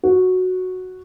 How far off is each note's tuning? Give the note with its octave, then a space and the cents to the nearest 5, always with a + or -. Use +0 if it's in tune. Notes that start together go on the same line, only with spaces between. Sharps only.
F#4 -5